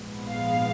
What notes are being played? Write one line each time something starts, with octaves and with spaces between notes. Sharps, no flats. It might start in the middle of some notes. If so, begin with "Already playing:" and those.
Already playing: A#1 G#2 F3 G#3 B3
F5